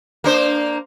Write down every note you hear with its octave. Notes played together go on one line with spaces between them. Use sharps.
A#3 D4 C5